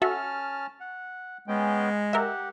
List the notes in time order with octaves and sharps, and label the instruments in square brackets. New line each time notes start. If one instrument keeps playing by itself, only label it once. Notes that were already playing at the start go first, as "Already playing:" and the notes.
[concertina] C#4 A5 F6 [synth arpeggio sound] F#4 A4 E5
[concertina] F#5
[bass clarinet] G#3 [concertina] B3 C#4 G5
[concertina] G4 F#5 [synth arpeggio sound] A#4 E5